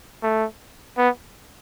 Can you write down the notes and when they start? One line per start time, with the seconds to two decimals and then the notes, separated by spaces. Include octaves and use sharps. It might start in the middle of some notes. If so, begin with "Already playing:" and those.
0.22 A3
0.98 B3